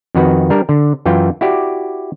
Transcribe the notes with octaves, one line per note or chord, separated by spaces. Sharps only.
F2 D#3 F#4 B4
G3 D4 A#4
D3
F#2 E3 F4 G5
E4 F#4 G4 D5